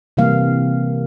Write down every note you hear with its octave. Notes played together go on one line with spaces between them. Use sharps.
C3 E3 G3 A#3 F5